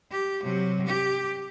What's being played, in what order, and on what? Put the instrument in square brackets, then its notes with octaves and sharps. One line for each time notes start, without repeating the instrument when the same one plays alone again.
[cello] G4
C3 F#3
G4